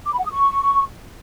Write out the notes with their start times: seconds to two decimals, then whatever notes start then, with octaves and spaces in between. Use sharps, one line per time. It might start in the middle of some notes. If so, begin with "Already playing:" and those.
0.06 D6
0.12 B5
0.19 F#5
0.25 D#6
0.31 C#6